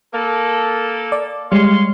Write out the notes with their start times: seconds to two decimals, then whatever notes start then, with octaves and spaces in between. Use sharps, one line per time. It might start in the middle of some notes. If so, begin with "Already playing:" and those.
0.14 A#3 A4
1.12 D5
1.52 G3 G#3 C#5 F5 C6